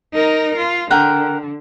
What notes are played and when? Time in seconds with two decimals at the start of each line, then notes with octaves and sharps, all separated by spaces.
0.14 D#4 A#4
0.56 F4
0.90 D3 A#4 F#5 G5